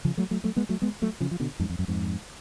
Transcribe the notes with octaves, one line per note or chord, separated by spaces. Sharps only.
C#3 F3
F#3 A3
F#3 A3
F#3 A3
G#3 B3
F#3 A3
G#3 B3
F#3 A3
C#3 F3
F3
B2 D3
F2 G#2
F2
F#2
F2 G#2